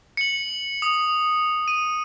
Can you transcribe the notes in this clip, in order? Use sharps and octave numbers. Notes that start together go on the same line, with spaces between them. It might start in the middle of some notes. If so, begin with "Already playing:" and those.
C#7 F#7
D#6
D#7